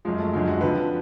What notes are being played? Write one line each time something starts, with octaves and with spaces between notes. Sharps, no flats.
F#2 F3 G#3
A3
F#2 D3 F3 G#3
F#4
F2 D3 F3 B4